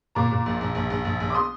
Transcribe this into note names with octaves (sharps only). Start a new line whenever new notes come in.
A#2 A#5 D6
A#2
A#1
A#1
A#1
A#1
A#1
A#1
D6
C6 D#6